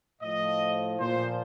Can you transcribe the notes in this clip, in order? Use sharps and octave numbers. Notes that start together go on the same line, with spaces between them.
A2 F3 D#5
A#2 F3 C5